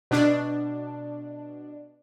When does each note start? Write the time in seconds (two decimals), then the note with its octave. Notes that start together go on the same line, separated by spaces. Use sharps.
0.11 B2 D4